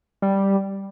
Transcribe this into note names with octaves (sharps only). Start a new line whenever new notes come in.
G3